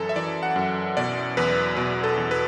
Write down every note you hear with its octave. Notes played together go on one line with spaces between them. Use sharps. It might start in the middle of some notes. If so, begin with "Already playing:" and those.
Already playing: F#2 E3 A4
E5
E3 D5
F#5
F#2
B2 D5
E2 B4
B2 B4
A4
E2
B4